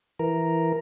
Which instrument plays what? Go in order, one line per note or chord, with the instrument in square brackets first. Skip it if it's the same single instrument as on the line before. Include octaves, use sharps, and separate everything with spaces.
[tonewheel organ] E3 A#4